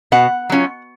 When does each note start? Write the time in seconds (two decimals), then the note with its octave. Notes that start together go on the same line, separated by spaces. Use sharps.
0.12 B2 F#5
0.50 F#3 C#4 F4